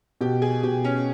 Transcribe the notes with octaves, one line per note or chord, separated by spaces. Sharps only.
B2 G4
G#4
B2 G4
C#4